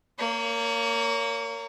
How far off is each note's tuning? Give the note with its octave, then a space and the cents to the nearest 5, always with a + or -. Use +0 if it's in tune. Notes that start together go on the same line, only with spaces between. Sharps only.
A#3 -15 C#5 +30